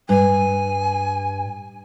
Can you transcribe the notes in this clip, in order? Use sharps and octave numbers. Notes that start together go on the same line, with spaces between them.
G2 G#5